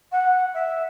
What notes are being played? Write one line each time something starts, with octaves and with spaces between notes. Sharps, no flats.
F#5
E5